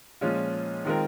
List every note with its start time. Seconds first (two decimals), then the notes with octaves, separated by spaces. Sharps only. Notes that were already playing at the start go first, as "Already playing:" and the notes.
0.21 A#2 F3 G#3 C#4 F4
0.85 D#3 G#3 C4 F4 A#4